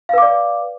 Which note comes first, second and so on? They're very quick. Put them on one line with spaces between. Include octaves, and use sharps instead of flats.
F5 B4 D6 D5